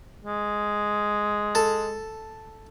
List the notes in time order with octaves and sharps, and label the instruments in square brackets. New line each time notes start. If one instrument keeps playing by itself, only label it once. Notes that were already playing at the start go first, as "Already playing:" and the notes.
[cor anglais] G#3
[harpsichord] A4